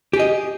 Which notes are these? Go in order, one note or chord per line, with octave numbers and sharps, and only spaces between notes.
G4 G#4 D#5